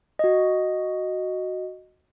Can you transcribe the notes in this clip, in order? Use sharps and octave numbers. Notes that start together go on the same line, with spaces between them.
F#4 D#5